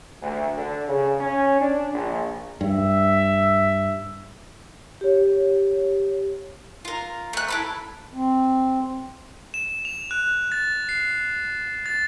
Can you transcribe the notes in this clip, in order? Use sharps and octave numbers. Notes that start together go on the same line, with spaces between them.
D2
D3
C#3
C#4
D4
A#1
G2 E5
G4 C#5
F4 A#4
A3 F#6
E4 A4 B5
C4
E7
F7
F#6
A6
C7
A6